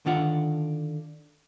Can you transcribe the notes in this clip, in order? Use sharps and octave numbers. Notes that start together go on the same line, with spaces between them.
D3 D#3 D4 F4 F#5